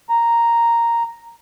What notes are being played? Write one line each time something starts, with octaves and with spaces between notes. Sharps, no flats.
A#5